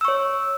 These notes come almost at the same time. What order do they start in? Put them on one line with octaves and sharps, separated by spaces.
E6 C#6 C#5